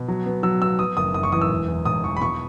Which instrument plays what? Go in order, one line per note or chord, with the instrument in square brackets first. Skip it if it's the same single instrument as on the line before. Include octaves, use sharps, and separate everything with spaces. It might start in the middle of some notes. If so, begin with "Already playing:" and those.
Already playing: [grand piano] B2
F#3
B3
F#3 E6
B3 E6
B3 D#6
F#1 D#6
F#2 D#6
C#6
E3 D#6
E6
E1
E2
E1 D#6
E2 C#6
B5
B2 C#6